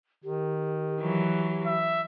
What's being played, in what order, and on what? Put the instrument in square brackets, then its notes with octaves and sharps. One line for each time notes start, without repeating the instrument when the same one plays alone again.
[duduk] D#3 [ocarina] G4
[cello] E3 F#3
[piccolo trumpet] E5